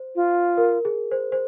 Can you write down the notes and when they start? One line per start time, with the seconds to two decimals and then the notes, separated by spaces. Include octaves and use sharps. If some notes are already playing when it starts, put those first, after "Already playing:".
Already playing: C5
0.16 F4
0.57 A#4
0.85 G#4
1.11 C5
1.32 C5